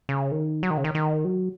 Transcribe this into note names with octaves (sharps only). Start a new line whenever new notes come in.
C#3
D#3
F#3
D#3
C#3
D#3
D#3
F#3